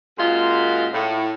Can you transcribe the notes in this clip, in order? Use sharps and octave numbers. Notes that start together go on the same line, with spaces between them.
F#2 A#2 G#3 F4
A2